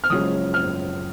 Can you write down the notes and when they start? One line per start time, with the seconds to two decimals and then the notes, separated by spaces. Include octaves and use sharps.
0.04 F6
0.10 F#1 F#2 F3 G#3 C#4 D#6
0.54 F6